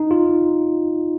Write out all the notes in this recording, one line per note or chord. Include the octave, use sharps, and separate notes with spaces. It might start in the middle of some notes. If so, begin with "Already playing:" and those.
Already playing: D#4
F4